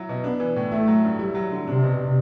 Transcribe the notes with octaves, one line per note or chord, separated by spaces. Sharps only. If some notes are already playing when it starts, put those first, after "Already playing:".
Already playing: F#3 E4
B2
B3 D4
E3
A2
A3 E4
F#3
G2
G3 E4
F#3
D3
C3 D4
B2